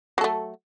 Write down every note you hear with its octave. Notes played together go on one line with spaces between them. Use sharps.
F#3 A3 A4